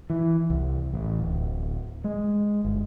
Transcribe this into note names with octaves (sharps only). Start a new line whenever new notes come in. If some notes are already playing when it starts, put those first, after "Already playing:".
E3
C2
A1
D1
G#3
G1